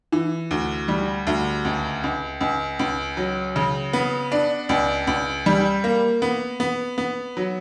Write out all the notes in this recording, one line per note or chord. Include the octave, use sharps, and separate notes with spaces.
E3
D2
G3
D2
C#2
C#2
C#2
C#2
F#3
C#3
B3
D4
C#2
C#2
G3
A#3
B3
B3
B3
F#3